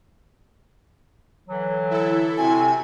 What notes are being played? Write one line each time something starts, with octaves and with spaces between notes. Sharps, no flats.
D3 E3 F#3
E4 A4
C3 C4 F#4 G#5